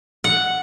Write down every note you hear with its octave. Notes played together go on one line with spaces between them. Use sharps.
F#5